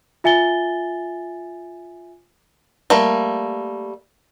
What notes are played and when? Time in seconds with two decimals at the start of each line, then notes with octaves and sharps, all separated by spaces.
0.24 F4 E5 G#5 A6 G7
2.90 G3 A3 A#3